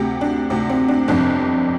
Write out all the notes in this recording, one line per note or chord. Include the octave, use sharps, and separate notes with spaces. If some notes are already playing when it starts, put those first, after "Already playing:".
Already playing: D2 C3 G4
D4
D2 C3 C4
C4
D4
G1 F2 C3 D4